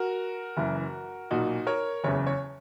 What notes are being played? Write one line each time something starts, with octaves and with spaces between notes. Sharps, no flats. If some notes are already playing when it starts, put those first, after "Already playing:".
Already playing: F#4 A#4
F#1 F#2 E3
B1 A#2 D#4 F#4
A#4 C#5
F#1 E2 C#3 C#5
C#5